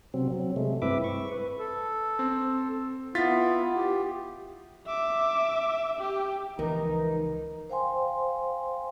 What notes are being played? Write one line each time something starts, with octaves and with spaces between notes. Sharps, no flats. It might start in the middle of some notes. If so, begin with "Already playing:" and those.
C3 F#3 C4
F#3
C3 G#3 A3
G2 C4 E4 B4 E5 D6
C#6
B4
A4
C4
B3 E4 F4 A6 B6
G4
E5 D6
G4
C#2 E3 F3 D#4 A#4
C5 F5 G5 G#5 C6